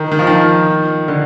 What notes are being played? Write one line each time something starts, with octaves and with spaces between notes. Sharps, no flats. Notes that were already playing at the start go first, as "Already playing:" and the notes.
Already playing: D#3
D#3
F3
D#3
D3